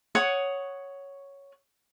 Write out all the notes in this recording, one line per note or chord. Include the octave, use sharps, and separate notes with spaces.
C#5 F#5 D#6